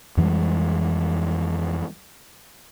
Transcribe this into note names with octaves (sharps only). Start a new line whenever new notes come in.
F2 E3 G3 G#3